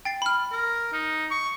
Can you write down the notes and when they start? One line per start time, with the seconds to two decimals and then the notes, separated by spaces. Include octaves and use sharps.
0.05 G5 A6 C7
0.22 B5 F6
0.52 A#4
0.93 D#4
1.31 C#6